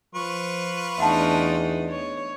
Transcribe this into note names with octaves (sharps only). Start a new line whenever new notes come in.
F3 F4 B4 C#6
E2 A3 D4 D#4 E5 F#5 A5
C#5